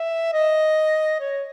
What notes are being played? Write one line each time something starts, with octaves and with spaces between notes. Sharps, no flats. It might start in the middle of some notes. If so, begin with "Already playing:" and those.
Already playing: E5
D#5
C#5